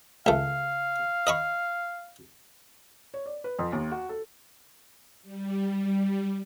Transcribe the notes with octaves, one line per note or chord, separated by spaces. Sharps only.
C#2 A3 F5
D#5 B5 C#6
C#5
D5
B4
F2
D#2
F#4
A4
G3